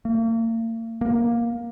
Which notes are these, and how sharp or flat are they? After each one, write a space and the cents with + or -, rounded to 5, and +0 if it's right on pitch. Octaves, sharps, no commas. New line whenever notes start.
A#3 -40
A#3 +10